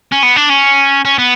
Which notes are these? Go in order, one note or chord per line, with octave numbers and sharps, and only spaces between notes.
C#4
B3
D4
C#4
C#4
B3